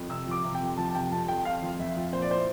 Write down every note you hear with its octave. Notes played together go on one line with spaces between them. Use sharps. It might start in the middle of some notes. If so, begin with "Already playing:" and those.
Already playing: F2
C3 E6
F3 D6
C3
G5
F2
F3 A5
A5
C3 G5
F2 A5
F2 G5
F2 F5
F3
F2 E5
F3
A#2 C5
D5
E4 C5